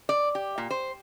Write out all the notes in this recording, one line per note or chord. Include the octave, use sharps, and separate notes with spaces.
D5
G4
A#2
C5